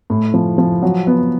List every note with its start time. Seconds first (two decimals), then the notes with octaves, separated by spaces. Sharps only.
0.10 A2
0.34 F3
0.58 F3
0.82 F#3
1.07 B3